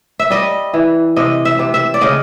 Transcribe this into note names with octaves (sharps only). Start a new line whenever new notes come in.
E5
G3 D#5
E3
C3 D#5
E5
C3
E5
D5
C#3 D#5